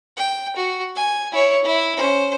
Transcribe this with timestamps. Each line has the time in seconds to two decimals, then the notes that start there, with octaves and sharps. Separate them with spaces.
0.17 G5
0.56 F#4
0.96 G#5
1.32 E4 C#5
1.64 E4
1.97 C#4 C5